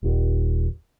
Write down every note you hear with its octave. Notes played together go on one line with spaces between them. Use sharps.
D#1